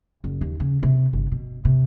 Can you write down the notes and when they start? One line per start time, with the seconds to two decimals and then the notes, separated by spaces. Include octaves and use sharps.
0.24 F#1
0.41 D#2
0.60 C#3
0.83 C3
1.13 G1
1.32 B2
1.65 C3